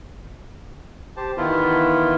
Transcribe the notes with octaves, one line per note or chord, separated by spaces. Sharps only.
G4 C5 A5
D#3 E3 B3 E4 F4